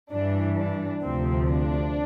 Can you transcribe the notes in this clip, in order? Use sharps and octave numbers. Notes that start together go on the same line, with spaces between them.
G2 E3 D4
D4
D2 C3 F3 C4
D4